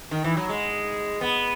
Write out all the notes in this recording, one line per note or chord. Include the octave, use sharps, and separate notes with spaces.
D#3
E3
F#3
G#3
B3